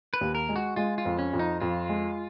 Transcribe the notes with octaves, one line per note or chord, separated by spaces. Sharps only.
B4
D#2
A#4
G#3
F#4
G#3 F4
F4
F2
C#4
F2
D#4
F2 F4
G#3